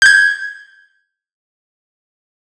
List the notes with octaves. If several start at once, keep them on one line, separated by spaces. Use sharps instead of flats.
G6 G#6